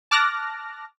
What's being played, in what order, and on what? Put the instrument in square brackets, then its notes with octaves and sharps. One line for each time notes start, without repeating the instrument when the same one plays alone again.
[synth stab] A5 D6 F6 F#6 A#6